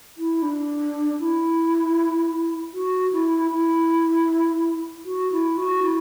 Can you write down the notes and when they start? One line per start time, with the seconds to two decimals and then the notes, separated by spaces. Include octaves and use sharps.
0.18 E4
0.42 D4
1.20 E4
2.74 F#4
3.13 E4
3.52 E4
5.05 F#4
5.32 E4
5.57 F#4
5.83 E4